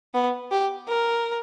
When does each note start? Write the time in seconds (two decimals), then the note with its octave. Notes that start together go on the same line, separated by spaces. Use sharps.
0.14 B3
0.51 G4
0.89 A#4